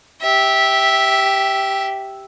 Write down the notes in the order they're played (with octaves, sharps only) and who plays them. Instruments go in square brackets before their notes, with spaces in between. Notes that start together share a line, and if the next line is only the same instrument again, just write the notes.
[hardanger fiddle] G4 E5